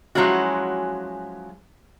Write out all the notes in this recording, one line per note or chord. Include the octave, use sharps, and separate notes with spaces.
F3 F#3 G#3 C#4 E4 F#4